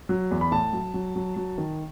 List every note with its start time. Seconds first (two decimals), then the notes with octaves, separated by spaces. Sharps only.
0.09 F#3
0.31 E2
0.41 B5
0.51 A2 A5
0.73 F#3
0.94 F#3
1.16 F#3
1.36 F#3
1.58 D#3